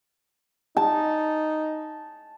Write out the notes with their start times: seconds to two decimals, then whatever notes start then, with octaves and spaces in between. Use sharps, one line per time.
0.77 D#4 A5